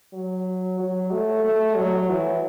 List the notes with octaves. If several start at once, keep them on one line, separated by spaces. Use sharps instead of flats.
F#3
F#3
A3
A3
F#3
E3